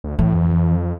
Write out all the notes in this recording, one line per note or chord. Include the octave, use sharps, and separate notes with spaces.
D2
A2 E3
F2